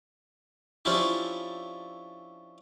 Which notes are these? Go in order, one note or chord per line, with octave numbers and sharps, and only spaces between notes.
F3 C#4 D4 E4 F4 G4